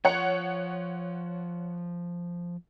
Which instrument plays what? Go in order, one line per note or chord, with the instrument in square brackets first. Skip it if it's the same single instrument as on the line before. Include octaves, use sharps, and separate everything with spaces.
[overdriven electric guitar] F3 [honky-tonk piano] C#5 F#5 C#7